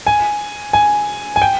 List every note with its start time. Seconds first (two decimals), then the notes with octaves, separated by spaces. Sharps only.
0.07 G#5
0.73 G#5
1.36 G#5
1.42 G5